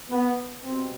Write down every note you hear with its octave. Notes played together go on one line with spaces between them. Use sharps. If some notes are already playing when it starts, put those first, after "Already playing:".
B3
C2 B2 C4